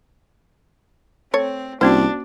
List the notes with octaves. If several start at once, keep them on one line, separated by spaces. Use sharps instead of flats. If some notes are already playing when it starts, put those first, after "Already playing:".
A3 C4 C#5
C2 A#3 C#4 D4 F#4 C5